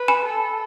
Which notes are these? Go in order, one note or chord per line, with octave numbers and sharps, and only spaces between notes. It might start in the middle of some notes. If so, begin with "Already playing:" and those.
Already playing: B4
G#5 B5
A4